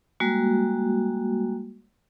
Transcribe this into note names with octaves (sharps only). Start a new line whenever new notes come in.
G3 G#3 A#3 F#4